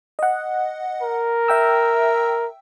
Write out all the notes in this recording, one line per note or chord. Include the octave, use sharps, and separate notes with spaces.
D#5 F#5
A#4
E5 G5 E6